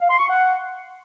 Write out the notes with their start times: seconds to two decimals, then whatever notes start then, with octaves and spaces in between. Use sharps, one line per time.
0.01 F5
0.10 C6
0.19 C#6
0.29 F#5